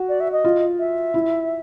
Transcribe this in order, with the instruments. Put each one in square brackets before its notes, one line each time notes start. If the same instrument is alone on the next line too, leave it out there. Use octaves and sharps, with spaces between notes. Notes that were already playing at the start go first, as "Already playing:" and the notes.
Already playing: [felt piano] F#4
[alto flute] D5
E5
D#5
[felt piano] F4
[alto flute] E5
[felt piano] E4